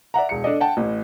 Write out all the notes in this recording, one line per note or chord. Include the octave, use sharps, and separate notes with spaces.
D5 E5 F#5 A#5
E1 C#7
D4 A4 D5 D#5
F#5 G5 A5
A1 A2